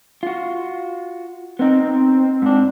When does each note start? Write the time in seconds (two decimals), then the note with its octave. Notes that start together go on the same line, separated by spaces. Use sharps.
0.23 F4 F#4
1.59 B3 C4 D#4
2.42 G#2 D4